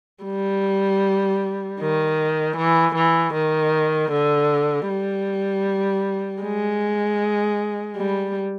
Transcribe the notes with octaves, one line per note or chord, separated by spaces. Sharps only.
G3
D#3
E3
E3
D#3
D3
G3
G#3
G3